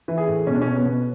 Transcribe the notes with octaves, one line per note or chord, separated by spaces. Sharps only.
E3
G#4
A2
B2 C#4
D4
B2 C#4
B3
B2